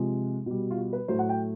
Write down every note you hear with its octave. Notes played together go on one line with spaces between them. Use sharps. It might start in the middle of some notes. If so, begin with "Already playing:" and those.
Already playing: C3 F3 G#3
B2 G3
F4
F#4
B4
A2 F#3 A3 C5
F#5
G5